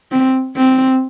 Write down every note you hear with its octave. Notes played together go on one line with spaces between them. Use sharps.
C4
C4